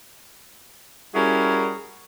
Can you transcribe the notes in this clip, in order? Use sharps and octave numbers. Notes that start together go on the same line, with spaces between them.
G3 C#4 E4 F#4 G#4 A#4